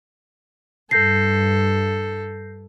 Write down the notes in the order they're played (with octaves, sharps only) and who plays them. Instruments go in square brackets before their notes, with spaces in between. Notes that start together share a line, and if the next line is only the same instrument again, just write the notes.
[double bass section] G2 [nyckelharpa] A4 [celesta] G6 A#6 C7